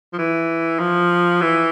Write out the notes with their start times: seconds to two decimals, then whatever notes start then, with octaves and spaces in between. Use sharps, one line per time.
0.13 F3
0.19 E3
0.80 F3
1.42 E3